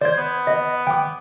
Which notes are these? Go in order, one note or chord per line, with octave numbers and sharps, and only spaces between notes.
C5 D5 G#6
B3
D#5
G5 D6